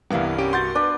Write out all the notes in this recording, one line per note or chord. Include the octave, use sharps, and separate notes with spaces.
C2 G2 E3 B3 E4 A#4 F5
C#4 G4 D7
F#4 F#5 C6 G6 A6
D4 B4